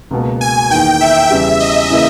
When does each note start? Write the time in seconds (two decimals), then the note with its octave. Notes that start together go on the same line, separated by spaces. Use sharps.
0.11 C#2 B2 A#3
0.41 G#5
0.70 E2 D#3 A#3 D#4 G5
1.00 E5
1.31 E2 C#3 G3
1.60 D#5
1.90 C#3 E3 A#3 E4